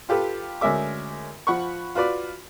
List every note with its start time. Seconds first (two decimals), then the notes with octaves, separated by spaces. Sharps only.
0.09 F4 G4 A4 B4
0.61 D2 G#3 C#4 A#4 E5 D6
1.47 F3 F#5 B5 C#6
1.95 F4 F#4 B4 D5